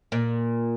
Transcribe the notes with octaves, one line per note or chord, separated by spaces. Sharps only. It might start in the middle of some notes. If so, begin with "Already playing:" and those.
A#2